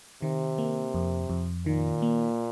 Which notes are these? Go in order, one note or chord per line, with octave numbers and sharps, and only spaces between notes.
C3 D#3
A#3
F2
F2
A#2 D#3
A#3